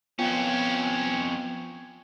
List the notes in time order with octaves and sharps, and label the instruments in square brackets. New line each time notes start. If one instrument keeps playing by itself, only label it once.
[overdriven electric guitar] F2 C#4 [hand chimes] B3 F4 G5